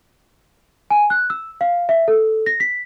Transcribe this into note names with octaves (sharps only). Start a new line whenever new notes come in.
G#5
F#6
E6
F5
E5
A4
A#6
B6